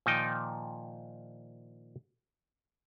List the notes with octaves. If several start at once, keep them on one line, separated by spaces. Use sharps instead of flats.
A#2 D#3 F3 D#4 G5